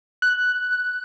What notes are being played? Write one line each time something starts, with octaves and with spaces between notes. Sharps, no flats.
F#6